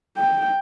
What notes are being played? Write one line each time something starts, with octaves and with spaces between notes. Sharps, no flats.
G5